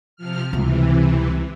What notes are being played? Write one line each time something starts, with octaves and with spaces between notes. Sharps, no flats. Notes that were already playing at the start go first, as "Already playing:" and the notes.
C3 F3 F6
C#2 C3 E3 G3